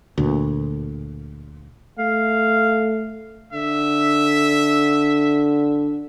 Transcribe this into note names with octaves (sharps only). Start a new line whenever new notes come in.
D2 A#2
A3 F5
D3 E5